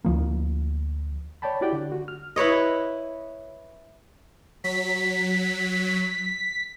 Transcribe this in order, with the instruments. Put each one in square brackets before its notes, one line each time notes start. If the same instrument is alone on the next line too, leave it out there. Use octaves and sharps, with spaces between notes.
[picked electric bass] D2 F3 A#3
[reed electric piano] C#5 D5 G5 A5 B5
E4 F#4 G4 D5 F#5 G5
D3
F#4
F6
[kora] E4 B4 C#5 D#5
[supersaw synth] F#3 [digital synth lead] B6